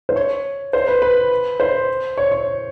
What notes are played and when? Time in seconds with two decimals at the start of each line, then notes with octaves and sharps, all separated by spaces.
0.09 C5
0.16 C#5
0.73 C5
0.88 B4
1.02 B4
1.60 C5
2.18 C#5
2.31 C#5